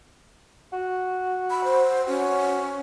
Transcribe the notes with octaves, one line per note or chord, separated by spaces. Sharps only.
F#4
B5
C5
C#4 F#4